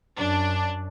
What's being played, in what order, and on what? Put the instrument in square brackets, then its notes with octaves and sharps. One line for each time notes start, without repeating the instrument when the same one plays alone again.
[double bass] F#2 [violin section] D4